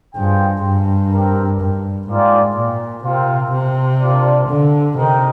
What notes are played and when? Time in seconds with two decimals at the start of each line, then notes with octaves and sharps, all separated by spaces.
0.15 G2 F4 G#4 C5 G5
0.63 G2
1.12 C4 G4 A#4
1.61 G2
2.08 G#2 A#3 F4 G#4 D5 G5
2.57 A#2
3.04 C3 C4 F4 A#4 F5
3.52 C3
4.01 D4 F4 A#4 D5
4.48 D3
4.97 C3 D#4 A#4 D#5 G5